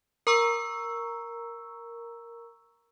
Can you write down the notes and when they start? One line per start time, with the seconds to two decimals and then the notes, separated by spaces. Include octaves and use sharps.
0.27 A#4 A#5 C#6 E6